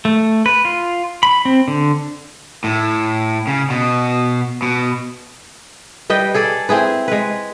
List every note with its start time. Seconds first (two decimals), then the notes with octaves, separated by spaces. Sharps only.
0.05 A3
0.46 B4
0.65 F4
1.23 B5
1.45 C4
1.68 D3
2.64 A2
3.47 C#3
3.70 B2
4.62 B2
6.10 G3 B4 D#5 G5
6.34 G#4 A4 D5
6.69 C4 E4 G#4 B4
7.08 G#3 B4